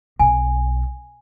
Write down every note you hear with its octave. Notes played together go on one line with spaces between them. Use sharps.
B1 G#5